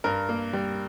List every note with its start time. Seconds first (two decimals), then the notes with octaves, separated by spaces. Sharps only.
0.04 G2 A#4
0.29 A#3
0.53 G3